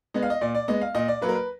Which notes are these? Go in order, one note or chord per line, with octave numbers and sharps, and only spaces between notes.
G#3 B3 D#5
F5
D#5
A#2 D5
D5
G#3 B3 D#5
F5
A#2 D#5
D5
F#3 A#3 B4
A#4
B4